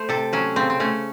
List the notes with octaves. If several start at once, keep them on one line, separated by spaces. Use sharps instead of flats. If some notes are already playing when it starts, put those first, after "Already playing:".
Already playing: A3 C5
C3 A4
F#3 C#4
C#3 C4
C4
A3 C#4